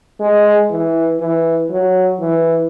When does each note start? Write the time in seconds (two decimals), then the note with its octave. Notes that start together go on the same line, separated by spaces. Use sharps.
0.20 G#3
0.70 E3
1.20 E3
1.70 F#3
2.20 E3